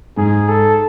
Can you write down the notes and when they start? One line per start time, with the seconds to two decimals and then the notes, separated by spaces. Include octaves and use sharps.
0.17 G#2 G#4
0.49 A4